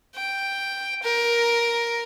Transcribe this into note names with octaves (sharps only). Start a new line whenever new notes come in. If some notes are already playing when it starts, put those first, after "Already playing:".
G5
A#4